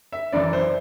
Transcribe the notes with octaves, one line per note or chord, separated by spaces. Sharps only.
E5
F#2 E3 D5
C5